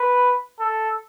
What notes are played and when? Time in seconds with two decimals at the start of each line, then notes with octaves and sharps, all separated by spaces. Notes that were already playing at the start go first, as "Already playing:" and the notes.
Already playing: B4
0.60 A4